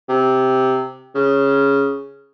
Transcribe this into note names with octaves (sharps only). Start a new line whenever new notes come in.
C3
C#3